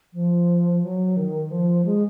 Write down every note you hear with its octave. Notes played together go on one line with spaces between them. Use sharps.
F3
F#3
D#3
F3
G#3